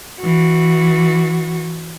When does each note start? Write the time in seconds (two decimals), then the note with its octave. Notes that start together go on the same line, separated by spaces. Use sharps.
0.22 E3 F#4